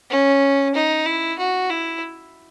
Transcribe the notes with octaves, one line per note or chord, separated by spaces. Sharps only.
C#4
D#4
E4
F#4
E4